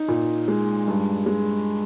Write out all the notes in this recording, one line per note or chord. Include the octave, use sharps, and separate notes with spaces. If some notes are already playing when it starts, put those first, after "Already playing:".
Already playing: D#4
A#2
G#3
G2
G#3